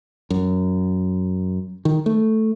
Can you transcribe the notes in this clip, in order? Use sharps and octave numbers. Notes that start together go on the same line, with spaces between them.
F#2
D#3
A3